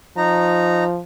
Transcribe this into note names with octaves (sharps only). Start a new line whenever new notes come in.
F3 D#4 A#5